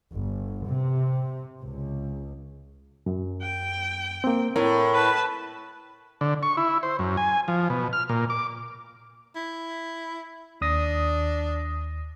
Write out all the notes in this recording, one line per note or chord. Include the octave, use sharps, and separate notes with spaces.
G1
C3
C#2
F#2
G5
A#3 C4
A2 A#4
B4 A5
D3
C#6
E4
C5
F#2
G#5
F3
B2
F6
A#2
D6
E4
D#2 D4 D#6 A#6